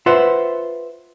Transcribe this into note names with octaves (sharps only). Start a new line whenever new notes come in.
F4 B4 C5 E5 F#5